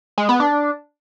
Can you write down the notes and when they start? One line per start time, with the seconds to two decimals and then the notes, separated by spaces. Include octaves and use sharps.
0.18 G#3
0.29 B3
0.40 D4